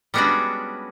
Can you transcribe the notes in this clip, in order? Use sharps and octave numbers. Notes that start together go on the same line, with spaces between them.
G3 G#3 B3 C#4 D4 F#4